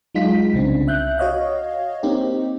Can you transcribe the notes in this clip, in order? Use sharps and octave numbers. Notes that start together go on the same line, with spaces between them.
F#3 G#3 D#4 F4 B6
C2 C#3 C4 D4
E5 F#6 G6
F#4 C#5 D#5 F5
A#3 C4 D#4 G4